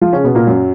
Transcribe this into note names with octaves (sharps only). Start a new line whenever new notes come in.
F3 F4
C#3 C#4
B2 B3
A#2 A#3
F#2 F#3